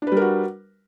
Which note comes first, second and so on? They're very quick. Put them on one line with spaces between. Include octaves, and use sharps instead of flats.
D4 B4 G3 A#4 F#4